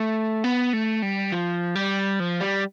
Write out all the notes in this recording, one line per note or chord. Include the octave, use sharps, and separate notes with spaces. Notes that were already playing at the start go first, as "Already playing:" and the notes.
Already playing: A3
B3
A3
G3
F3
G3
F3
G3